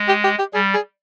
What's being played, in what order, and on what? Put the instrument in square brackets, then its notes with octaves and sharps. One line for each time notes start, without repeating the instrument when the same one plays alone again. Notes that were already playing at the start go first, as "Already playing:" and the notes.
Already playing: [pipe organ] G#3
[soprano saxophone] G4
G4
G4
[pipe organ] G3 [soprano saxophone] G#4
[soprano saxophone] G#4